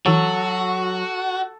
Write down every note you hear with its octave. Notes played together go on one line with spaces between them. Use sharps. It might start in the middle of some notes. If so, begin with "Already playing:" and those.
E3 F#3 F#4 A4 C#5